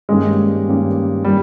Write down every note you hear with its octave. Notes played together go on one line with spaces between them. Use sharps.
G2 D#3 G#3 A#3 C#4 G4
G2 D#3 A#3 C#4 G4
D#3 G3 A#3